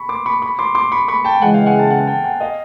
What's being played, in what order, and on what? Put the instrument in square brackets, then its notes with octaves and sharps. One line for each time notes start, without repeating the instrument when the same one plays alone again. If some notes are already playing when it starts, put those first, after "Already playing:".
Already playing: [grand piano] B5 C#6
C6 D6
B5 C#6
B5 C#6
C6 D6
C6 D6
B5 C#6
B5 C#6
G5 A5
[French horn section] C#3 E3 G#3 [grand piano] F#5 G#5
[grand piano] F5 G5
F#5 G#5
G5 A5
F#5 G#5
G5 A5
F#5 G#5
D#5 F5